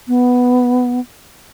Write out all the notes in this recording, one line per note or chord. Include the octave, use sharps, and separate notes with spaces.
B3